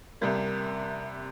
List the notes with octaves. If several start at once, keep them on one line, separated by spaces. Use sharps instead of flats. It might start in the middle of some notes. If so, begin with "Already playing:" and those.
C2 C3 G3 A#3